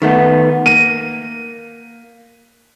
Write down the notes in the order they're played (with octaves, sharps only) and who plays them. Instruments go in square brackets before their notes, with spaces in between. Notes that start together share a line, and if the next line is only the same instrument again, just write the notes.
[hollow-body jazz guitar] D#3 A3 B3
[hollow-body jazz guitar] A#3 [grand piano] D#7